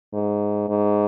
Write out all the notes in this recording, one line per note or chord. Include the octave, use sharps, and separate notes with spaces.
G#2
G#2